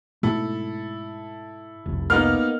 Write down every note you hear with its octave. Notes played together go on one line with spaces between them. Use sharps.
G#2 B2 A3 E4 A4
F1 C2
A#3 B3 D#4 F6